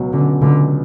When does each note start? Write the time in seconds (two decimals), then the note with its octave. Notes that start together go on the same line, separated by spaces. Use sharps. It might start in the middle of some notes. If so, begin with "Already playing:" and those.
Already playing: C#2 B2 F#3 C#4
0.13 D3 C#4
0.42 C#2 D3